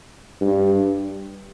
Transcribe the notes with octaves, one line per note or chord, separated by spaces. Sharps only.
G2